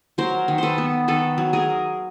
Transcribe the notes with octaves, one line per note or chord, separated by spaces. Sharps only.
F#3 A#4 C5
D#3
A4 B4 C5
B3
D#3 A4 B4
F#3
G#4 A#4